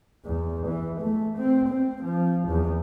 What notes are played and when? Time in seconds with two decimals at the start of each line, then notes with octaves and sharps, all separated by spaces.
0.25 E2
0.67 E3
1.01 A3
1.37 C4
1.68 C4
2.04 F3
2.49 E2